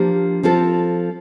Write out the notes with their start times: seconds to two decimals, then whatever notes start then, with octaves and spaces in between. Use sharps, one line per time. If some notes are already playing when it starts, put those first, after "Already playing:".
Already playing: F3 A#3 D4 G4
0.43 F3 C4 F4 A4